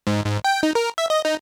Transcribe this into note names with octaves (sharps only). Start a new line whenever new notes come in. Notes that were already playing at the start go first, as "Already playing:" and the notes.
G#2
G#2
G5
D#4
A#4
E5
D#5
D#4